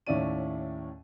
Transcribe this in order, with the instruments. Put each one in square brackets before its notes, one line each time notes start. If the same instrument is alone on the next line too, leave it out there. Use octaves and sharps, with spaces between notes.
[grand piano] D#2 A2 C#4 E4 D5 D#7